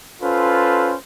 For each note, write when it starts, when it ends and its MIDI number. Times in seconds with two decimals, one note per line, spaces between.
0.23 0.95 61
0.23 0.95 65
0.23 0.95 69
0.23 0.95 71
0.23 0.95 72